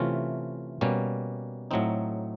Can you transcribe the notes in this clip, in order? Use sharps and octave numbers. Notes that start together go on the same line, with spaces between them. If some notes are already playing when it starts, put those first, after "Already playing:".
Already playing: C3 E3 A3 C#4 F4
B2 G3 A#3 C#4
A2 F#3 A3 C4 D#4